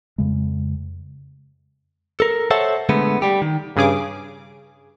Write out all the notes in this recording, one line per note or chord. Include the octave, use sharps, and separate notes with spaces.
F2 C#3 G#3
A4 A#4
A4 C5 C#5 E5 F#5 A5
D3 G#3 A3 B3
G3 G4
D#3
G2 C#3 G#4 D6